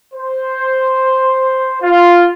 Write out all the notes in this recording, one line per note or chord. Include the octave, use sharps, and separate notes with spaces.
C5
F4